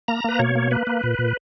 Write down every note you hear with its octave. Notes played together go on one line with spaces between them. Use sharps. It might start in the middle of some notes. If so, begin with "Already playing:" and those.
A#3 A#5
A#3 B4
B2 C#5
A#3
A#3 B4
A#3
A#2
A#2